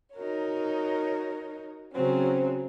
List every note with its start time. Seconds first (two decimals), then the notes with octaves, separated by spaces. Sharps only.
0.15 D#4 F#4 A#4 C#5
1.94 C#3 F#3 C4 C#4